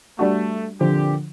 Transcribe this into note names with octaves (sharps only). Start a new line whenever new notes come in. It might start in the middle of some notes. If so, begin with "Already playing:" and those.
G3 A3 D4 F#4
A#2 D3 F3 C4 G4